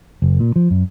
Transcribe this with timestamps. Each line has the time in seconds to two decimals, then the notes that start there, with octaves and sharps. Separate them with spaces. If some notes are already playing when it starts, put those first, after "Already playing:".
0.22 F#1
0.40 A#2
0.56 F3
0.71 F#2